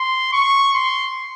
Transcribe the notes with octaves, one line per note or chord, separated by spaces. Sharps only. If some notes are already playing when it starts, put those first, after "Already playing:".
Already playing: C6
C#6
C6